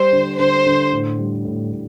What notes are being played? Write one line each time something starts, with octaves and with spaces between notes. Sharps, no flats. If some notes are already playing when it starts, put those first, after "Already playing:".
Already playing: G3 C5
D3
D3 C5
D3
A2
G3
A2
A2